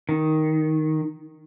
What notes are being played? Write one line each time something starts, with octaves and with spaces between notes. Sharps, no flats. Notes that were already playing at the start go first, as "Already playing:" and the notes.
D#3